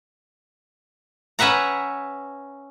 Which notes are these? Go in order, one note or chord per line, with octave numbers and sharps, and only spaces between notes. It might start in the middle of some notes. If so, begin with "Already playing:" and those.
C#4 B4 E5 F#5 A#5